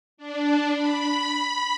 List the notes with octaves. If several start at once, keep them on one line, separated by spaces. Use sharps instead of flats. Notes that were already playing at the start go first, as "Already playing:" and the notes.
D4
B5